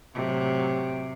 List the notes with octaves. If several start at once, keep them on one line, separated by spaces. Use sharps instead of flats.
A2 C3 F#3